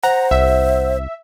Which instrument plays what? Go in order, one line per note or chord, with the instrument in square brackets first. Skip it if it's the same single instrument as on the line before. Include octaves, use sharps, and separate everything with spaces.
[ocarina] C5 [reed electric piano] F#5 [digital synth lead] A#5
[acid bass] C2 [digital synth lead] E5